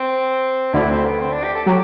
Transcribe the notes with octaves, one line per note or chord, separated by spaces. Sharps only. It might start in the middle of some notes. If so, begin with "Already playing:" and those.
Already playing: C4
D2 D3 E4
C4
B3
C4
D4
G4
A4
F#3 G4